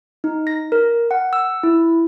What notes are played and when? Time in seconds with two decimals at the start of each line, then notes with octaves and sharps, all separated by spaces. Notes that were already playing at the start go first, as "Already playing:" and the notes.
0.24 D#4
0.47 A#6
0.72 A#4
1.11 F#5
1.33 E6
1.63 E4